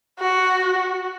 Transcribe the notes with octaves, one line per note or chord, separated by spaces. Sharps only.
F#4